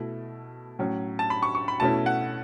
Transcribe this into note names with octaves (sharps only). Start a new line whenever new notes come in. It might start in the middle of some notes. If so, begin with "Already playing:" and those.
Already playing: B2 A3 E4
A2 F#3 C#4
A5
B5
C#6
C#6
B5
B2 A3 C#4 E4 A5
F#5